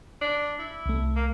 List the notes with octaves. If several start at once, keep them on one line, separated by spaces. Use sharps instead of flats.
D4
E4
C2 A3
A#3